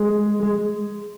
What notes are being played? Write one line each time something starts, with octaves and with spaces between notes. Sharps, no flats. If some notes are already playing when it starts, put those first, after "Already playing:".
Already playing: G#3
G#3